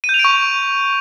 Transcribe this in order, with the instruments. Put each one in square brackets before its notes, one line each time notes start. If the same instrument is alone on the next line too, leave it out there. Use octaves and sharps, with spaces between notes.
[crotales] D#7
G6
F7
D7
C#6